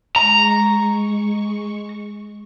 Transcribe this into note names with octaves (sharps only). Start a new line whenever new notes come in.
G#3 A#5 C#6